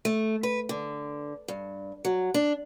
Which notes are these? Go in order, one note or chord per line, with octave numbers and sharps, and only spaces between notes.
A3
B4
D3
G2
F#3
D4